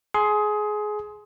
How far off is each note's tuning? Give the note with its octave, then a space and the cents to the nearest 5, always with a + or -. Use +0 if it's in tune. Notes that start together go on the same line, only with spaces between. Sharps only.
G#4 +20 C6 +0